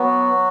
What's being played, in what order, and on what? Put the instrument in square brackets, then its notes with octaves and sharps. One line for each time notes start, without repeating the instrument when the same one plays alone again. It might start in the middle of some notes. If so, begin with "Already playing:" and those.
Already playing: [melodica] F#3 F#4 [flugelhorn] B3